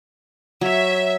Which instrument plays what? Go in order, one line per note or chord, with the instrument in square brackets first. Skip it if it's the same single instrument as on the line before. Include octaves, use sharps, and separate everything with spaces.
[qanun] F#3 C#5 [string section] E5